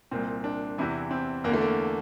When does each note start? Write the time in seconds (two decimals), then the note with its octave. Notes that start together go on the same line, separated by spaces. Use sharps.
0.11 C2 A#2 C4
0.44 D4
0.78 E2 C3 E3 E4
1.11 C4
1.44 E2 A#3
1.49 D3 A3
1.61 A#3